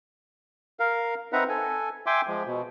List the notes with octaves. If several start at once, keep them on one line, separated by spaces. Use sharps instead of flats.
A#4 F5
C4 D#4 B4 E5 F#5 A#5
A4 G#5
E5 G5 G#5 C6 D6
F3 G#3
B2